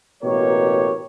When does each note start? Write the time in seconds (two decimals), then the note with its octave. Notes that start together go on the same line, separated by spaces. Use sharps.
0.23 A1 B2 A#3 G4 A#4 C#5